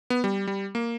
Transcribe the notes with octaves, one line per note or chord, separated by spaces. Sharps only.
B3
G3
G3
A#3